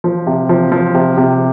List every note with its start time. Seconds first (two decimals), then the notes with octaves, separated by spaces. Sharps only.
0.04 F3
0.27 C3
0.49 F3
0.72 F3
0.95 C3
1.17 C3